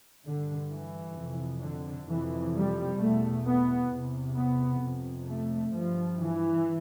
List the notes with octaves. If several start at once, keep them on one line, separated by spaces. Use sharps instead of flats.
G2 D3
E3
F2 C3
D3
F2 C3 E3
G3
E2 B2 A3
B3
E2 C3
B3
F2 C3
A3
G2 F3
E3